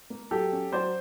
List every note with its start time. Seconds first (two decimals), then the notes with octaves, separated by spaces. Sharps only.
0.10 A#3
0.31 F#3 G4 A4
0.52 C#4
0.72 F#3 C5 D5